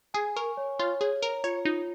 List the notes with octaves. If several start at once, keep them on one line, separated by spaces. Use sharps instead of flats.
G#4 G#5
A#4 C#6
C#5
F4 C#5
G#4 C#5
A#4 A#5
F4 C#5
D#4 F4